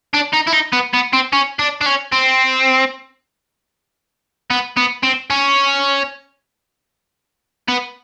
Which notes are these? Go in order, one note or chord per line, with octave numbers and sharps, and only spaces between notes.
D4
D#4
E4
D#4
B3
B3
C4
C#4
D4
D4
C#4
C4
B3
B3
C4
C#4
B3